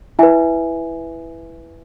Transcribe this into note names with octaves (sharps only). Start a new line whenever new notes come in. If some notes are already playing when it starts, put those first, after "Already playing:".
E4 B4 E5 G#5